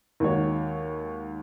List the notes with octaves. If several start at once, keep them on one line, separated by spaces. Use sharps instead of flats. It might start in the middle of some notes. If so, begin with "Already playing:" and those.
D#2 D#3 G#3 F#4 C#5